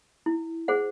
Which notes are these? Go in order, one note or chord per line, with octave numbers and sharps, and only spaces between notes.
E4
G#4 C5 F#5